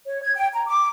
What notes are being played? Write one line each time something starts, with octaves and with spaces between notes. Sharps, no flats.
C#5
G#6
G5
A#5
D6